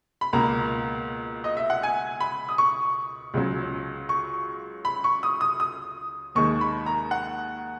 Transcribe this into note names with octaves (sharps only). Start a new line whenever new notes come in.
B5
C#2 B2 A#3 A#5
D#5
E5
F#5
G#5
B5
D#6
C#6
C#2 C#3 F#3
C#6
B5
C#6
D#6
D#6
D#6
D#2 D#3 G#3 C#6
B5
A#5
F#5